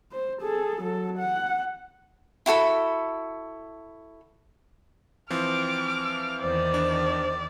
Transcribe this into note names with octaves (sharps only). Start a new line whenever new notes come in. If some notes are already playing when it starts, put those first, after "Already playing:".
C5
G#4 A4
F#3 A4
F#5
E4 F#4 A4 B5
E3 F3 C4 D6 F6
E2 D#3 C5 D5
D4